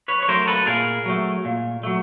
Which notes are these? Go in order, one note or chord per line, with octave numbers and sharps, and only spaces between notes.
B4 C#5
C#5
F#3 A3 A#4 C5
A4 B4
A#2 G#4 A#4
F#3 A3
A#2
F#3 A3